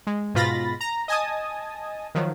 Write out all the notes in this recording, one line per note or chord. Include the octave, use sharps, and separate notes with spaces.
G#3
G#2 B2 F4 B5 A6 A#6
A#5
D#5 G#5 A5 D#6
D#3 F3 F#3